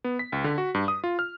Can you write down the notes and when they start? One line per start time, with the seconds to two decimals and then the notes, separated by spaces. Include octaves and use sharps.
0.04 B3
0.19 B6
0.32 C#2
0.44 D3
0.58 F#4
0.74 G2
0.88 D#6
1.04 F4
1.19 F6